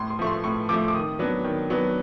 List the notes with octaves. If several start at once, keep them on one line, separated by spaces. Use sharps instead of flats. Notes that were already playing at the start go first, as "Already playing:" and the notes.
Already playing: A2 C6
C6
F3 A3 C#6
C6
A2 C#6
F3 A3 D6
D6
D#3 D#6
F#3 B3 D4
D#3
F#3 B3 D4